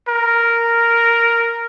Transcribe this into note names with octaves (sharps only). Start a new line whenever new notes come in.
A#4